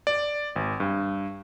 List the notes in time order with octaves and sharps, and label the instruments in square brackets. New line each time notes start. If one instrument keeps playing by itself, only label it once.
[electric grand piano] D5
G#1
G2